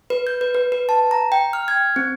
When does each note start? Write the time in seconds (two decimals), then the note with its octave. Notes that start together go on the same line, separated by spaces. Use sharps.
0.10 B4
0.27 G6
0.41 B4
0.55 B4
0.72 B4
0.89 A5
1.11 A#5
1.32 G5
1.53 F6
1.68 G#6
1.96 C4